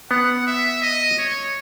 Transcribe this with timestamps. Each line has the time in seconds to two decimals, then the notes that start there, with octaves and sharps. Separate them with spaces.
0.10 B3 F#5
0.47 E5
0.82 D#5
1.18 C#5